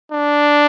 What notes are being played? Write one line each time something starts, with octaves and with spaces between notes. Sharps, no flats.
D4